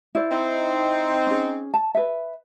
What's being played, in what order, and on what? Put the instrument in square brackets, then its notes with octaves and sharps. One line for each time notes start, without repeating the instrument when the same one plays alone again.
[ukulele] E4 C5 D5
[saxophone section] C4 D#4
[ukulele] C#4 G#4
A5
B4 E5